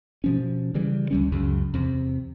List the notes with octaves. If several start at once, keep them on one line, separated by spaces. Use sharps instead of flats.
B2 F3 C#4
C#3 E3 G3
D2 G3 C#4
C#2 F#2 C#3
E2 C3